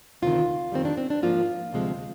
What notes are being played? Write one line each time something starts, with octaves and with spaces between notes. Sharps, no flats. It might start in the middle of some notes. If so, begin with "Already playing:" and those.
D2 C3 D#3 F4
F2 D#3 G3 C4
D4
C4
D4
G#2 F3 A#3 F4
D2 C3 F3 G#3